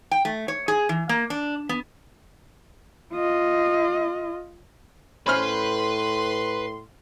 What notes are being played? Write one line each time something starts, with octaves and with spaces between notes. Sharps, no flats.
G5
A3
C#5
G#4
E3
A#3
D4
B3
F4 D#5
A2 C#4 B4 C5 C6 F6